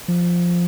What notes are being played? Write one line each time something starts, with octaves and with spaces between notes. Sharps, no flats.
F3